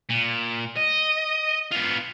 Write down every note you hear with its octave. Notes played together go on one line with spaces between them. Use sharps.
A#2
D#5
B3 F4